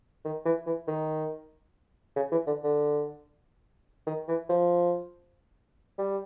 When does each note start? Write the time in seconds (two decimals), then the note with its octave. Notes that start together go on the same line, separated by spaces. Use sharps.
0.25 D#3
0.45 E3
0.66 E3
0.87 D#3
2.16 C#3
2.32 E3
2.47 D3
2.63 D3
4.06 D#3
4.28 E3
4.49 F3
5.98 G3